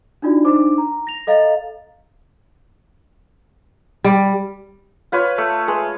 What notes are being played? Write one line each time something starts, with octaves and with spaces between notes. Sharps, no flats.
D4 D#4 F4 F#4 D5
D4 D#4 C5 D6
A#5
A#6 F7
A4 D#5 F5 A#5 A6
G3
F4 B4 C#5
A3
G#3 B4